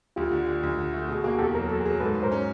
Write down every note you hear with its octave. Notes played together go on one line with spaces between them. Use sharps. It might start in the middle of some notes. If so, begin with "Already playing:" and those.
D2 F4 G4
D3
D3
D2
D3
A3
B2 F#4 G#4
A#3 F#4 G#4
E2 G4 A4
F#3 A#4
F#3 A4
G#4 A#4
F#3
G#2 A4 B4
G#2
A#4 C5
C#4